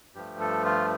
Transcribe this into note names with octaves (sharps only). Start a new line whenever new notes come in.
G2 F3 A3 G4
A4
F4